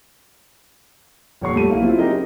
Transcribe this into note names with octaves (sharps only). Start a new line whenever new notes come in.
F1 A#2 C#5 F#5 C#6 C7
G3 A3 D#7
B1 A#3 E4 F5
F#3 C4 E4 F4
D#4 G4 G#4 A#4 D#5
C#4 E4